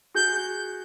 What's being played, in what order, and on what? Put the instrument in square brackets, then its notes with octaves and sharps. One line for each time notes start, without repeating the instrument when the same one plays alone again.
[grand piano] F#4 G#4 [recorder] G6